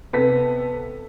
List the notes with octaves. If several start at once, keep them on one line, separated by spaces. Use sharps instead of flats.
C3 B3 A4 B6